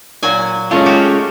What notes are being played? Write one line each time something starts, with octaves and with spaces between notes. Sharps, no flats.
A#2 F#3 G#5
G#3 A3 C#4 F4
F#4 G4